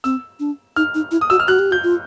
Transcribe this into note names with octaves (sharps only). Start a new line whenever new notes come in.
C4 E6
D4
D#4 F6
D#4
E4
D#6
F#4 E6
F6
F#4 F#6
G4
F#4 G6
F4